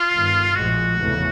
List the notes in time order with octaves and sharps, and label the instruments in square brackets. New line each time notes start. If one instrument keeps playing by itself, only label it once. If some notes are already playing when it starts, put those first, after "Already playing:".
Already playing: [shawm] F4
[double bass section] G1 G2 D#3
[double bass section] A#1 A2 F3 G#3 [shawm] F#4
[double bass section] F1 E2 C#3 E3 A3